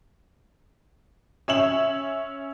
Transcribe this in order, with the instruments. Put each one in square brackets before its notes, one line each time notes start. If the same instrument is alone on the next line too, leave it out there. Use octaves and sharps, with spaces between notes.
[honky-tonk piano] C#4 E5 E7 F#7